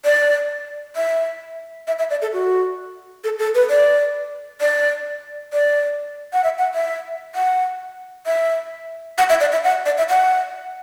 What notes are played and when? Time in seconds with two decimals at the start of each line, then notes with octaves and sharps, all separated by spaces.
0.05 D5
0.96 E5
1.87 E5
1.99 E5
2.10 D5
2.22 A4
2.33 F#4
3.24 A4
3.39 A4
3.55 B4
3.70 D5
4.61 D5
5.53 D5
6.33 F#5
6.44 E5
6.59 F#5
6.74 E5
7.35 F#5
8.26 E5
9.18 F#5
9.30 E5
9.40 D5
9.52 E5
9.64 F#5
9.86 D5
9.98 E5
10.09 F#5